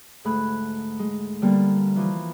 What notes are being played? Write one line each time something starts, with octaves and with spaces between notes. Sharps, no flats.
D2 G#2 A3 G#4 B5 F#6
G#3
D3 G3 A#3 B3
E3 F3 F4